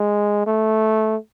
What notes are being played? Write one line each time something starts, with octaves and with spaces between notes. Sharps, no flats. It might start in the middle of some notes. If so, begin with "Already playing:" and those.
Already playing: G#3
A3